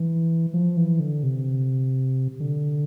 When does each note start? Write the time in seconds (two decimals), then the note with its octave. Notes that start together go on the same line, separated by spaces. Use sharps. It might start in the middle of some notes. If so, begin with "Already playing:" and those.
Already playing: E3
0.54 F3
0.77 E3
1.00 D3
1.23 C3
2.40 D3